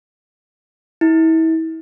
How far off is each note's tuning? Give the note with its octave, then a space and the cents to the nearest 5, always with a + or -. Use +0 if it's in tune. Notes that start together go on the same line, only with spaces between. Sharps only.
E4 -35